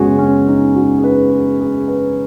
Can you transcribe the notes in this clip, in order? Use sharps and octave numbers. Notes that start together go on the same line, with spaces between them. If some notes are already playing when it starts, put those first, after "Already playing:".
Already playing: F#2 C#3 G#3 B3 F#4 G#4
C#4
D#4
F#4
G#4
B4
G#4
G#4
B4